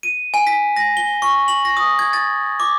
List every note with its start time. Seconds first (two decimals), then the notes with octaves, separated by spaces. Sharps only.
0.03 D#7
0.34 G#5
0.47 B6
0.76 A#6
0.97 G7
1.22 C#6
1.48 F#7
1.65 A#6
1.77 D#6
1.99 G#6
2.13 A6
2.60 D6